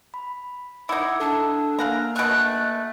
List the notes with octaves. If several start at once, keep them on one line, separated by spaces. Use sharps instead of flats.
B5
D#4 E4 F#5 D6 E6 G#6
D4 A4 A5 E6
A#3 A#4 F5 F#5 G#5 A#5
B2 A3 F#6